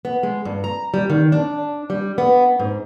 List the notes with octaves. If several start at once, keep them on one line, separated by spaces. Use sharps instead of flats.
B3
G#3
G2
A#5
G3
D#3
D4
G3
B3
G#2